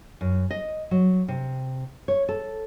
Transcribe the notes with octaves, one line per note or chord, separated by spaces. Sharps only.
F#2
D#5
F#3
C3
C#5
A4